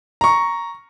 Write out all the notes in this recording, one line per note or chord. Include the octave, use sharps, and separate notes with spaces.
A#5 C#6